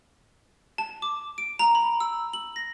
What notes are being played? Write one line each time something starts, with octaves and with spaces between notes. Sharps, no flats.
A5
D6
D7
A#5
B5
E6
F#7
A#6